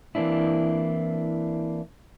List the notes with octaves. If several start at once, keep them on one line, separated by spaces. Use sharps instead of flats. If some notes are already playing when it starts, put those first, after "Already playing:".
E3 A#3 C4 D4 E4